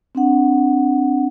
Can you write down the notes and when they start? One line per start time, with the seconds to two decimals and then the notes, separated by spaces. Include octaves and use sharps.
0.15 C4 D4 F#5